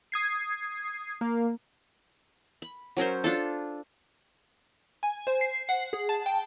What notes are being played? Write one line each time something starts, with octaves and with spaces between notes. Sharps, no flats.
D#6 G#6 C7
A#3
B5
F#3 C#4 A#4 C5
D4 F4 A4
G#5
C5
C7
F#5
G#4
A5
G5